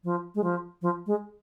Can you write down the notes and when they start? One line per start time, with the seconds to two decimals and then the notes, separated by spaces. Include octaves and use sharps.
0.04 F3
0.35 G#3
0.44 F3
0.82 F3
1.06 G#3